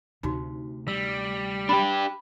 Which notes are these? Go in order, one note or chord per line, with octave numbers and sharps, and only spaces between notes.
D2 C3 D#4 F#4
G3 E6
D4 G4 B5